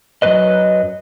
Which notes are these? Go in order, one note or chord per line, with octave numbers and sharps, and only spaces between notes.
F#2 F3 F#3 B4 D#5